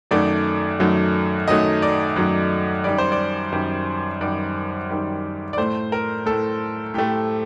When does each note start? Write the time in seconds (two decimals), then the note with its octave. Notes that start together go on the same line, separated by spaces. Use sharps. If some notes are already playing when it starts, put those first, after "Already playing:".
0.11 F#2 D#3 F#3 A3 D5
0.80 F#2 D#3 F#3 A3
1.48 F#2 D#3 F#3 A3 D#5
1.82 D5
2.16 F#2 D#3 F#3 A3
2.84 F#2 D#3 G3 D5
2.98 C5
3.12 D5
3.52 F#2 D#3 G3
4.21 F#2 D#3 G3 D5
4.90 F#2 D#3 G3
5.53 D5
5.57 A2 A3 C5
5.92 A#4
6.26 A2 A3 A4
6.94 A2 A3 G4